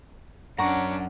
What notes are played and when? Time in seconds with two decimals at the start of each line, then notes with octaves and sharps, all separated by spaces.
0.58 F#2 C#4 D4 F#5 A#5 C#6